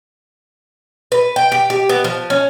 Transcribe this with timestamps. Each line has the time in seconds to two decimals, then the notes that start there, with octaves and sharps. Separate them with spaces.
1.12 B4
1.36 G5
1.52 G4
1.70 G4
1.89 B3
2.04 F3
2.30 C#4